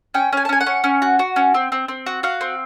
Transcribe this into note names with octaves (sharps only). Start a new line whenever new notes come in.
C#4 G5
C#4 G#5
A5
C#4 G#5
F#5
C#4
C#4
F#4
F#4
C#4
C4
C4
C4
F#4
F#4 F5
C4